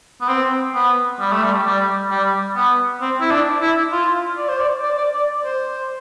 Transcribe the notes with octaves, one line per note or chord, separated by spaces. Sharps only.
B3
C4
B3
G3
A3
G3
G3
G3
B3
C4
E4
D4
E4
F4
D5
C5
D5
D5
D5
D5
C5